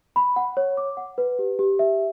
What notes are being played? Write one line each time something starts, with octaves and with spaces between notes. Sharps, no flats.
B5
F#5
C#5
D6
F#5
B4
G4
G4
E5